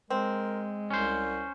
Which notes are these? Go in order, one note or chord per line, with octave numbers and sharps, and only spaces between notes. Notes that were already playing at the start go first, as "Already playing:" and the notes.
G#3 C4 A#4
C2 C#4 C5